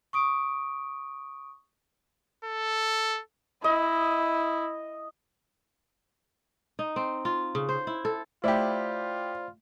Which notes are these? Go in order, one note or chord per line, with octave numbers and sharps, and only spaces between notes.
C#6 D#6 D7
A4
E4 D#5
D#4
C4
F4
C#3
C5
E4
A4
A3 E4 F4 G4 C5 D5 B5